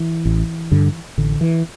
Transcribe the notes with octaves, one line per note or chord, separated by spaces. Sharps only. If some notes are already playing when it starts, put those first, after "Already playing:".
Already playing: E3
A1
G2 D3
A1 D3
E3